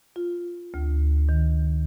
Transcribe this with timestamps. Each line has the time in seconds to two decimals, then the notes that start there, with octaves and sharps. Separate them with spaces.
0.16 F4
0.74 D2
1.29 D#3